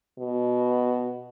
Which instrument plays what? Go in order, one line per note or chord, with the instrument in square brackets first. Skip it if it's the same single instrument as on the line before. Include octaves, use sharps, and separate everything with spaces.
[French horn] B2